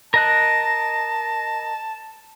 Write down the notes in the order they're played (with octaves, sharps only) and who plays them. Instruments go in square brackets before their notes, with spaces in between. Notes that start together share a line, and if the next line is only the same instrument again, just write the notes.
[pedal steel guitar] A#4 D#5 F#6 [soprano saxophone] A5